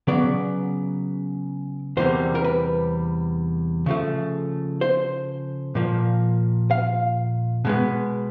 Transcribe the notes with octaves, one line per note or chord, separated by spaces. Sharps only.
C#3 F#3 B3 D5
E2 C3 E3 G3 A#3 C5
A#4
B4
C#3 F3 A3
C5
A#2 F3 A#3
F5
B2 G#3 B3